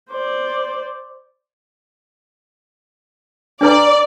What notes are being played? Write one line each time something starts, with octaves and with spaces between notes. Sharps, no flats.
C5 D5
D4 B4 D5 A#5